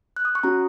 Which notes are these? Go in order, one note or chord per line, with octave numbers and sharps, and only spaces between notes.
F#6
D#6
C#6
C#4 F#4 A#5